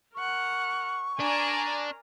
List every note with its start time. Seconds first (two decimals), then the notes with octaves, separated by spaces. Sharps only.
0.15 A#4 F#5 C#6
1.20 D4 A#4 D5 G#5 A#5